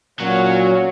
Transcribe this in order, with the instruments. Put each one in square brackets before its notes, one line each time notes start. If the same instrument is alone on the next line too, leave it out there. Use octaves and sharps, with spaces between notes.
[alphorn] A#2 [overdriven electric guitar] F#3 [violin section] C#4 F#4 C#5